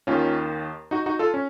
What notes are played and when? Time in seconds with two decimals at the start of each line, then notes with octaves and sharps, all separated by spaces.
0.07 D#2 D#3 C#4 F4
0.91 D#4 F#4
1.06 D#4 F#4
1.19 F4 A4
1.34 C#4